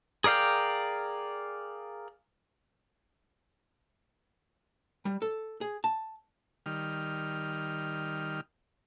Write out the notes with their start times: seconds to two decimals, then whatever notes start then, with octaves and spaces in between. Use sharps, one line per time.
0.24 G#4 A#4 D5 F5 G5
5.05 G3
5.22 A4
5.61 G#4
5.84 A5
6.66 D#3 G3 F6